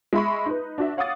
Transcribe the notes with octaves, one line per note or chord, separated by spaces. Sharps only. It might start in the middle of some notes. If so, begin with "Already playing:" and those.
G#3 E5 B5 C#6
D#4 B4
D4 F#4 E5
C#5 F5 F#5 D6 D#6 A6